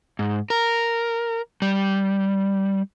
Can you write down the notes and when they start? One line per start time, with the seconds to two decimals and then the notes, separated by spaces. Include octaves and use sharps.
0.19 G#2
0.50 A#4
1.62 G3